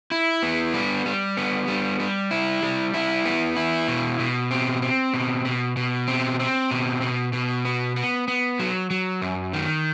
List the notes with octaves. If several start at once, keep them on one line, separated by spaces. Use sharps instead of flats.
E4
B3
G3
G3
B3
G3
G3
E4
G3
E4
B3
E4
B2
B2
C4
C4
B2
B2
B2
C4
C4
B2
B2
B2
B3
B3
B3
F#3
F#3
F#2
D#3